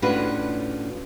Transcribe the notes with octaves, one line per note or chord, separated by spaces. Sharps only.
A2 C#4 D4 F4 F#4 B4